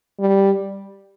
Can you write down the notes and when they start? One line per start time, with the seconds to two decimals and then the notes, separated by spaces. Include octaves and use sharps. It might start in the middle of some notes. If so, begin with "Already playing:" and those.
0.20 G3